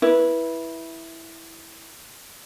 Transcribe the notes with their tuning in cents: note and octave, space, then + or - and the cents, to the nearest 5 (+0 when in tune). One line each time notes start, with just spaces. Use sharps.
E4 +0 B4 -15